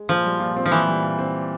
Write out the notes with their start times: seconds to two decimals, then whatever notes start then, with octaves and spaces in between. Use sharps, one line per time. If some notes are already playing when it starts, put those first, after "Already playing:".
Already playing: G#3
0.09 A#2 F3
0.25 G3
0.40 A#2
0.57 C4
0.65 F3
0.71 A#2 E3
0.87 G3
1.02 A#2
1.19 C4